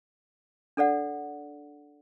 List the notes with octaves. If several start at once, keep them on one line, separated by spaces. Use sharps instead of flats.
D4 A4 D5 F#5